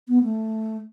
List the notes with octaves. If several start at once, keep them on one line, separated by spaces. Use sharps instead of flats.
B3
A3